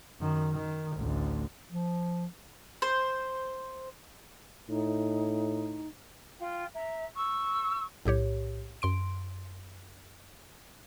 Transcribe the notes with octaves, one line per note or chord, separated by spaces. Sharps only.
F#2 D#3
D#3
A1 D2
F3
C5
A2 D#4
F4 G5
E5 A#5
C#6 E6
B1 A2 G4 C#5
F#2 C6 D7